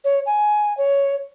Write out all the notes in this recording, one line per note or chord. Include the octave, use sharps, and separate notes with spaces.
C#5
G#5
C#5